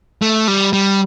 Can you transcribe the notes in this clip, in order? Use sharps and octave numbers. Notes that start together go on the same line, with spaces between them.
A3
G3
G3